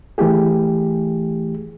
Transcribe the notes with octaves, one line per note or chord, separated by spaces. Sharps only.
E3 A3 E4 G4 G#4